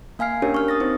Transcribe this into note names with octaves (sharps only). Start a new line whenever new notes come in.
A#3 F5 G#5 F6 C7
C#4 D4 G4 A#4 C#5
C#6 F6
D#6 A6 A#6
C4 D#4 C5